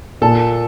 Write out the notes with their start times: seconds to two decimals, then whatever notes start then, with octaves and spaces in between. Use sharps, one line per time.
0.22 A#2 A4